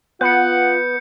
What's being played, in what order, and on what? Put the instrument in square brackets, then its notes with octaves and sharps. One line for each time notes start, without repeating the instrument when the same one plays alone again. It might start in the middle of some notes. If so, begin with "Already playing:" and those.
[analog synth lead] B3 [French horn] F4 [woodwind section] F#5 [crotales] G6 C#7